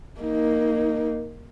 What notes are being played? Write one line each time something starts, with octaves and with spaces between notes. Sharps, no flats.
A#3 D#4